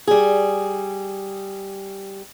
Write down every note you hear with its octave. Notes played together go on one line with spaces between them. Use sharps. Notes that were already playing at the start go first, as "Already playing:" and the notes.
G3 G#4